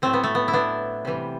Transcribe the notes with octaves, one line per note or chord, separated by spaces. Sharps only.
A2 F#3 A3 C4
B3
A3
B3
E4
B3 D4
C3 E3 G3